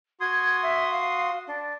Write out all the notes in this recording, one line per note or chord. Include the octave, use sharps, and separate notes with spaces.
F#4 C6 D#6 G#6
E5
F5
D4